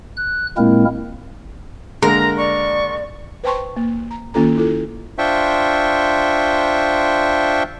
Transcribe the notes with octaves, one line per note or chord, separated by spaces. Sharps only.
F#6
A#2 G#3 A#3 C4 E4 A#4
D3 G#3 A#3 A#4 A#5
D5 C#6
B4 C5 G5 A5 C6 C#6
A#3
A#5
D#3 A#3 C#4 F4 A4 A#5
E4 F4 A4
D4 F4 C5 E5 G5 C#6